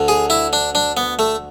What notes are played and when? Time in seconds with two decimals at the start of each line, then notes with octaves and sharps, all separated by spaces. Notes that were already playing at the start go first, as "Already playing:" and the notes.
Already playing: D2 D3
0.08 G#4
0.30 E4
0.53 D4
0.75 D4
0.97 B3
1.19 A3